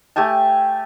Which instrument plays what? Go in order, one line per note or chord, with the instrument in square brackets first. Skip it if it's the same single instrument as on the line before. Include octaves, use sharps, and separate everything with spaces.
[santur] A3 G4 G#5 A5